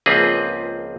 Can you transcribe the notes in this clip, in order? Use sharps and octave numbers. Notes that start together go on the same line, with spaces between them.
C#2 F3 A#3 C4 G#4 B4